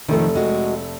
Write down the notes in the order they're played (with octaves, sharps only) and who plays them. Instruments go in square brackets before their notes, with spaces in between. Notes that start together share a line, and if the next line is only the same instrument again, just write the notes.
[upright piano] F1 A3 A4 [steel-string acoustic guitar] D#3 F3
[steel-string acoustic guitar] G#3 F#4